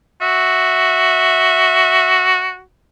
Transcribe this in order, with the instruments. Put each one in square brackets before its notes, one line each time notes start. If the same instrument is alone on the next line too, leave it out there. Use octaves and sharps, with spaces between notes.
[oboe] F#4 [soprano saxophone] E5